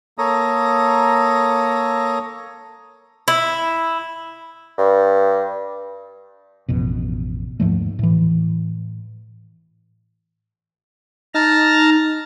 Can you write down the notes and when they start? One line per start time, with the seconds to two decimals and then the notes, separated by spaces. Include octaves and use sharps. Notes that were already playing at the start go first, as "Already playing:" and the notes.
0.18 A#3 A4 C#5 A#5 D#6
3.28 E4
4.78 G2
6.69 A1 F2 B2
7.60 D#2 G#2 F3 A3
7.99 A2 E3
11.34 D#4 A5 A#5 F6